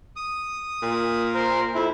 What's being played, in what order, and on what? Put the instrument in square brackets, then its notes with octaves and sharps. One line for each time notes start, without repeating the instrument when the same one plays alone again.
[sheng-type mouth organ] D#6
[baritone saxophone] A#2
[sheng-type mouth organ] A#4 C5
[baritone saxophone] F2 [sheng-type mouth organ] E4